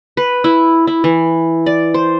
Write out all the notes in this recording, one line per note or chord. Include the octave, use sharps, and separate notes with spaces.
B4
E4
E4
E3
D5
C5